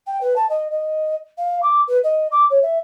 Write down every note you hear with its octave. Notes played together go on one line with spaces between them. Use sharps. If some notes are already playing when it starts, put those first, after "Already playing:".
G5
B4
A5
D#5
D#5
F5
D6
B4
D#5
D6
C#5
E5